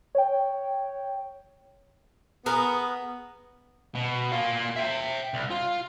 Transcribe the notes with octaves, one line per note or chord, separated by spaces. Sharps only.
C#5 G5
B3 G#4 A#4 B4
B2
A#3 F4
E5 G5
C2
F4